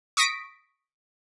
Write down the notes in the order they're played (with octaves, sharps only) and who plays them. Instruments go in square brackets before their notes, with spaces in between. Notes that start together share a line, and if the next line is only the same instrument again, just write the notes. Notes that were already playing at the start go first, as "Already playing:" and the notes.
[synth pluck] C#6 D#6 A#6 B6 D7